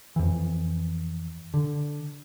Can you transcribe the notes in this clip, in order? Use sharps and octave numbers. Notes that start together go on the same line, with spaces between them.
F2 E3
D3